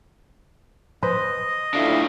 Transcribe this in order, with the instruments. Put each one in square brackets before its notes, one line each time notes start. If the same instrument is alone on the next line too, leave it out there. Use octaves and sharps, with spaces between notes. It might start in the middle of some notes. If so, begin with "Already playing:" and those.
[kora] B4 C5 [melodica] D#5
[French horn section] D2 A2 E4 [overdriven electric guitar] D4 F4